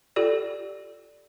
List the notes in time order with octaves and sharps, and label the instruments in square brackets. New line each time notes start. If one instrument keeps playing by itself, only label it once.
[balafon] F4 G4 A4 D5